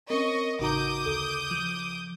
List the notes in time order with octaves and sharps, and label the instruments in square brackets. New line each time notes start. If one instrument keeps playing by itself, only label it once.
[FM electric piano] C4 C#4 [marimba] A#4 [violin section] D#5 C#6
[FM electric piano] A1 F#4 A#5 [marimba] C#3 D#4 [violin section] D6 D#6 G6
[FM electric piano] D2 [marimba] A4
[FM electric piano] F3